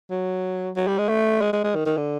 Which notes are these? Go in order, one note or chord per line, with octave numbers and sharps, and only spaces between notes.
F#3
F#3
G3
G#3
A3
G#3
G#3
G#3
D#3
D#3
D3